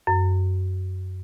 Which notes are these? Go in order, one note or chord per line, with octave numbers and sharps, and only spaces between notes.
F#2